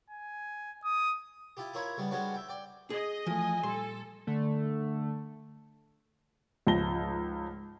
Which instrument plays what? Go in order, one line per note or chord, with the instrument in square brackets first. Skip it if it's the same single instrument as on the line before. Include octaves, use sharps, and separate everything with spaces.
[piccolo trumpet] G#5
D#6
[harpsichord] E4 F4 G4
E4 F4 A#4 C#5 E5 B5
C#3 G3 B3
G3 G#3 B3 C#4 D4 F#4
E5 G5
D5 G5
[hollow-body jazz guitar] G#4 [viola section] D#5
[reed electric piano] E3 A3 [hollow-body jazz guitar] F3 [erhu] G#5
[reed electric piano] A#2 G3 [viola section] A4 [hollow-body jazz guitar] C6
[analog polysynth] D3 A3
[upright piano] C#2 G#2 F3 A5 A#6 G7